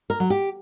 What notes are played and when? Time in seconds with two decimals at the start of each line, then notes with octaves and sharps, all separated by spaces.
0.10 A#4
0.20 F#3
0.30 G4